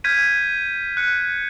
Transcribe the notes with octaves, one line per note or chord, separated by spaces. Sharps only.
F6 G6 G#6 B6 D#7
F#6 C#7